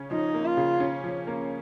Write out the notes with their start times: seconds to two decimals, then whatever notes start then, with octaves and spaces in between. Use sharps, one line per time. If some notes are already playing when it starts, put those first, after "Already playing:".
Already playing: C#3 C#4
0.11 F3 D#4
0.34 A#3
0.46 F4
0.57 C#3
0.80 C#4
1.04 F3
1.27 A#3